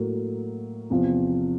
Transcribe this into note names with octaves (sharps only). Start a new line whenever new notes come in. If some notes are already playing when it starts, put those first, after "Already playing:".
Already playing: A2 F#3 A#3
E2 C3 F3